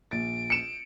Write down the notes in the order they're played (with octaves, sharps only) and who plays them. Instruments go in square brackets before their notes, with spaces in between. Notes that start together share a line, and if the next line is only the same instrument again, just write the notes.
[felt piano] A#1 A6 [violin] D7
[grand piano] C#7 E7